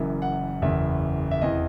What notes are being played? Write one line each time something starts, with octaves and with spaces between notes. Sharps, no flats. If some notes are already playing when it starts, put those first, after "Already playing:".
Already playing: F#1 F#2 E3
F#5
F#1 E2 C#3 E3 E5
E5
E2 C3 E3 D#5